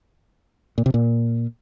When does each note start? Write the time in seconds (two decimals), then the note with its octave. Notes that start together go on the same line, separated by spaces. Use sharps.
0.78 A#2
0.86 C3
0.94 A#2